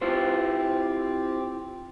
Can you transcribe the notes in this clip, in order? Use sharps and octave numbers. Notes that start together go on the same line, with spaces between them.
C4 E4 F4 G4 C5